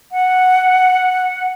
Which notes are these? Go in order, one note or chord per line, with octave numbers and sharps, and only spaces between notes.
F#5